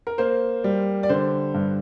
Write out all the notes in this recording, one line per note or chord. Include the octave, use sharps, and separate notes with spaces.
A#4
A#3 C5
G3
D5
D3 C5
G2